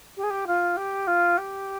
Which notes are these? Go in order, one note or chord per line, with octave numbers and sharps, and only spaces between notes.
G4
G#4
G4
F4
G4
F4
G4